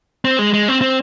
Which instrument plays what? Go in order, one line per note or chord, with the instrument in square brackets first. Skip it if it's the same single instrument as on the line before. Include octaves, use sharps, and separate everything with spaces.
[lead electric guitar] C4
G#3
G#3
C4
C4